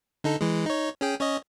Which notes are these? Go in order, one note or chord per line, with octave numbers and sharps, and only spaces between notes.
D3 D#4 A4
E3 G#3
D#4 C#5
C#4 G#4 G5
C#4 C#5 D#5